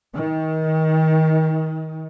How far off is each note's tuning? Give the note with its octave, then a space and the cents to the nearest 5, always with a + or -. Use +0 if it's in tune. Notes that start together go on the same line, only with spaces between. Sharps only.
D#3 +30